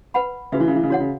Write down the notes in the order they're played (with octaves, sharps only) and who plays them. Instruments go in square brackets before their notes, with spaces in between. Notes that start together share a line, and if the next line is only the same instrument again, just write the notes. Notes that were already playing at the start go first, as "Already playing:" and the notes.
[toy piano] B4 F#5 B5
[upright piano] C#3 [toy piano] F#4 B4 E5
[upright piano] E3
C#3
E3
C#3
[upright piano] E3 [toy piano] F#4 C#5 F#5
[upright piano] C#3